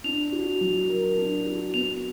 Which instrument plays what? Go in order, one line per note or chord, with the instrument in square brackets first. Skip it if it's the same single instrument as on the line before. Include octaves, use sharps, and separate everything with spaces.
[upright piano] D4 [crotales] F7
[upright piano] F#4
F#3
A#4
D4
F#4
[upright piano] B3 [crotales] F7